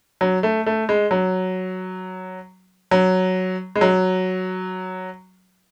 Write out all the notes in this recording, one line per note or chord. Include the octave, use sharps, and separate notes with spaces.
F#3
A3
A3
G#3
F#3
F#3
G#3
F#3